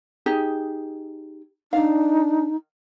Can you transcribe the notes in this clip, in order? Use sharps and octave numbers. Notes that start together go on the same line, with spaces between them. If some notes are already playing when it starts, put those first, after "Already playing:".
D#4 G4 G#4
D4 D#4 F5